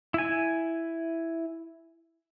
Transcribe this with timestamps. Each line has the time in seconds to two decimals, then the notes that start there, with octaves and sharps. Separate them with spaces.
0.14 E4 G#5